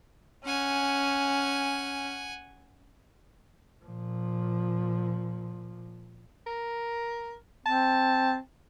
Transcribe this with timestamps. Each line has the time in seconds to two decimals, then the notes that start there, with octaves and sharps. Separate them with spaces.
0.45 C#4 F#5 G#5
3.85 A#2 F3
6.47 A#4
7.66 C4 A5